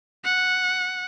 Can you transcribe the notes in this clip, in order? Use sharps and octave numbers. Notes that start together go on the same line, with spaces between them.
F#5